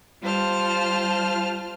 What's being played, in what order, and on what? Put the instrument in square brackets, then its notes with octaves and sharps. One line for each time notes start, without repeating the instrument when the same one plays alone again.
[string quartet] G3 F4 C5 A5 F6